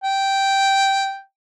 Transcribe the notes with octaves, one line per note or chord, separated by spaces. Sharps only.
G5